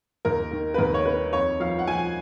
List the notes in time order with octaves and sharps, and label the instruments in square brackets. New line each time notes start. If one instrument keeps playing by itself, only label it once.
[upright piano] D#2 A#4
D#3
B4
D#2 A#4
C#5
D#3 B4
F2 C#5
F3 F5
F#5
F3 G#5